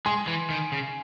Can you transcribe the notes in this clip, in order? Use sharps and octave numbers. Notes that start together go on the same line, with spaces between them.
G#3 G#5 C6
E3
D#3
C#3